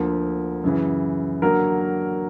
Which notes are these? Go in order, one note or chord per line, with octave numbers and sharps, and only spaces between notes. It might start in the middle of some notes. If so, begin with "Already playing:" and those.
Already playing: D2 D3 F3 A#3
F#2 C#3 E3
D3 F#3 A#3 A#4